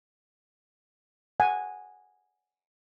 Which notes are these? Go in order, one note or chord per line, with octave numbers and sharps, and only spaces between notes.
F#5 G#5